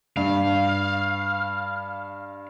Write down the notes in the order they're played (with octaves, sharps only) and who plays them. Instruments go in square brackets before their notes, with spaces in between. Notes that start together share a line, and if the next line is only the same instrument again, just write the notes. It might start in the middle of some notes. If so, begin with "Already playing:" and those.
[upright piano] G2 [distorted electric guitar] F5